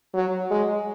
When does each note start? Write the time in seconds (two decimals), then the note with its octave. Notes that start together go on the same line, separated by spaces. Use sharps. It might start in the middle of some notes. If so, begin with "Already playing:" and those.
0.14 F#3
0.51 G#3